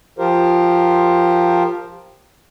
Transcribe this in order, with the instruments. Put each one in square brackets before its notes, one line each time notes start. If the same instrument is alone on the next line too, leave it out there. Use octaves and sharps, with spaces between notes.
[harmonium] F3 F4 G4 A#4 C5